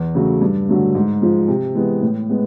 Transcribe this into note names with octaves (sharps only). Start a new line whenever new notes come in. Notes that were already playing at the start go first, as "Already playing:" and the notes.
Already playing: E2
C#3 F#3 A3
G2
D3 F#3 A3
G#2
F3 G#3
C3
E3 G#3 B3
A2
G#3 B3